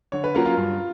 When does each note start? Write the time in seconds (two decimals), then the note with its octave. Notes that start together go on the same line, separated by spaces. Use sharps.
0.12 D3 C#5
0.24 B4
0.35 F#3 A#3 C#4 F4
0.45 F4
0.57 G2